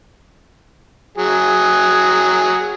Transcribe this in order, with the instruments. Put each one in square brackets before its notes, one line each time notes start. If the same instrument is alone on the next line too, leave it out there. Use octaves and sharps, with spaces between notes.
[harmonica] F#3 G#4